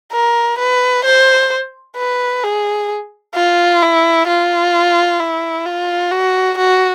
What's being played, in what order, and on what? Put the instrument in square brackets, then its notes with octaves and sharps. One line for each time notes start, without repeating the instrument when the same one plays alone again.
[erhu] A#4
B4
C5
B4
G#4
F4
E4
F4
E4
F4
F#4
F#4